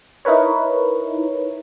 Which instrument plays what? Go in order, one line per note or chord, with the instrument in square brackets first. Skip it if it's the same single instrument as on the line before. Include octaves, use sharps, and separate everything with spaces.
[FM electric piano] D#4 E4 A#4 B4 C#5